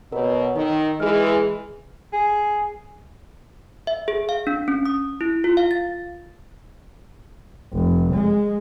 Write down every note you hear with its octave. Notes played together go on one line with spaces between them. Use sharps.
B2 A#4 C#5
D#3 A#4
E3 G#3 G#4 F6
G#4
E5
G#4
F5
D4
C#4
D#6
E4
F4
F5
A6
F1
G#3